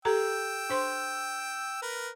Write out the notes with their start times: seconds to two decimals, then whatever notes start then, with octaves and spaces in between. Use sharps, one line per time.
0.05 G4 A4 G5 A#5 E6
0.70 D4 C5 C6
1.82 A#4 B4